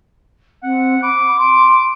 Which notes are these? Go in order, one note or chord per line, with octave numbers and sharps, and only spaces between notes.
C4 F#5
B5 D6
C6